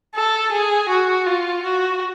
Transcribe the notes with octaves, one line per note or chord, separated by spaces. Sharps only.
A4
G#4
F#4
F4
F#4